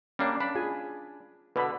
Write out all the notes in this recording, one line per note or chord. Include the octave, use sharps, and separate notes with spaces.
G3 A#3 C#4 D4
D4 B5
F4 G#4 G#5
B2 D3 B4 B5